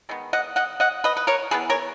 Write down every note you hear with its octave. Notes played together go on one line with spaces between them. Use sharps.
D#3 G#3 B3
D#5 F#5
D#5 F#5
D#5 F#5
B4 D#5
B4
A#4 C#5
E3 B3 G#4 B4
A#4 C#5